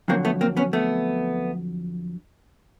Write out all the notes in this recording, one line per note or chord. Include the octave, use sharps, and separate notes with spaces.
F2 D3 F#3 A#3 C4
A3 B3
A#3 C4
B3 C#4
A3 B3